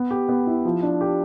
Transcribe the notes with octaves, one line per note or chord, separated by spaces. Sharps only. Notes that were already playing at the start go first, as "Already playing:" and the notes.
Already playing: B3
G4
B3
E4
F3
D4
G4